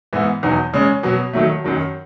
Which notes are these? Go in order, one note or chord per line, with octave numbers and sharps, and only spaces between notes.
G#2 E3 B3
E2 B2 F#3 B3 D#4
C#3 G#3 C#4
B2 F#3 B3
D#3 F#3 A3
F#2 D#3 F#3